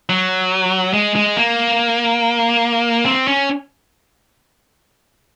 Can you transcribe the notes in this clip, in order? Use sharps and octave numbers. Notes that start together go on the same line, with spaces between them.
F#3
G#3
G#3
A#3
C4
C#4